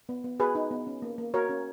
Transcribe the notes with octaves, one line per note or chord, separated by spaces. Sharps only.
B3
B3
F#4 G#4 B4
D#4
B3
C#4
A#3
A#3
F#4 A#4 C#5
C#4